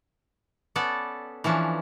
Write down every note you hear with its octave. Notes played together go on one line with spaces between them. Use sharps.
B3 C#4 A4 D5
E3 F3 C#4 D4